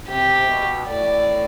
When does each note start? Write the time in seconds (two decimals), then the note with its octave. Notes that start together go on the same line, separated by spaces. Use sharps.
0.09 C3 G4
0.49 B2
0.87 A2 D5